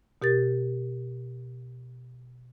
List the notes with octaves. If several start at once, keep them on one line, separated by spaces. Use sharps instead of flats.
B2 G4 A#4 A6